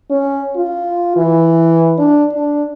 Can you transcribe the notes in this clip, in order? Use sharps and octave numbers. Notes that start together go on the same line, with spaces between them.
C#4
F4
E3
D4
D4